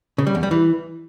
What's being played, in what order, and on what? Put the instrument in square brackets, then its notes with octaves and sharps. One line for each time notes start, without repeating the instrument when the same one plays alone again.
[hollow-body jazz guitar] C#3
G3
E2
G3
E3